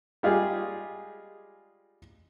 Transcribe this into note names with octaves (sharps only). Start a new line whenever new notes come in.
G3 G#3 F4 G4 G#4